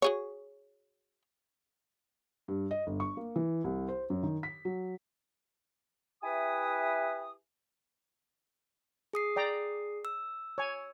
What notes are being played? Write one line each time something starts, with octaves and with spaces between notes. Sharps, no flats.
F#4 G#4 C#5
G2
D#5
G1
C#6
A#3
E3
C2
C5
F#2
D#3
B6
F#3
E4 G4 B4 E5 G#5 D#6
G#4 D#6 C7
D5 G5 A#5
E6
C#5 G#5